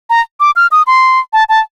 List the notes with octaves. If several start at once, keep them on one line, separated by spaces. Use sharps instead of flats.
A#5
D6
F6
D#6
C6
A5
A5